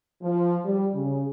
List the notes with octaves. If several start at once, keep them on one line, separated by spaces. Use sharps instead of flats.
F3
G3
C#3